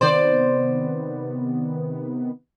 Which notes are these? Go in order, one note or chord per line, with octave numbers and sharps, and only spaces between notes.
C3 D#3 B3 C5 D5